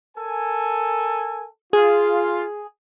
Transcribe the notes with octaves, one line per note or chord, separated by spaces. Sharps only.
A4 A#4 G#5
F4 G#4